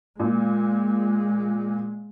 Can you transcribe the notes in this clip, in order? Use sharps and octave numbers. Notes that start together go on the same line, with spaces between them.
A#2 G#3